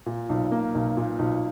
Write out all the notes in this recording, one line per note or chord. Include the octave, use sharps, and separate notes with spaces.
A#2
B1
A#3
B1
A#2
B1